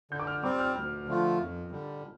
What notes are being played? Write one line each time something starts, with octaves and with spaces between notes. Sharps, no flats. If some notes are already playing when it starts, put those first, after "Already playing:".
D3 G6
D6
F6
G3 C4 D6
F6
D2
D3 F3 A3 F4
F2
D3 G3